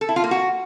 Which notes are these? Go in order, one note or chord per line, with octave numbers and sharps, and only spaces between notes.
A4
E4
F4
A#3
F#4